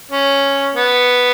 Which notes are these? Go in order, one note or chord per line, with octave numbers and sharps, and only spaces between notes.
C#4
B3